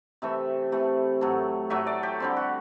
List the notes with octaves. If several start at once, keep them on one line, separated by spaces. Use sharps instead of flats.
C3 E3 A3 E5
C3 E3 A3
A2 F#3 A3
A2 F#3 A3 E5
D5
G4
D3 G3 C4
F#4